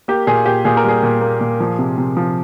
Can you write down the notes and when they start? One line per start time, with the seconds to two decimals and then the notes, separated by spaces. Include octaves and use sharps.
0.08 A#3 G4
0.27 A#2 G#4
0.46 A#2 G4
0.65 A#2 G#4
0.77 A#4
0.84 G3 G#4
1.03 A#2
1.21 A#3
1.41 A#2
1.60 F3
1.79 C3
1.98 C3
2.17 F3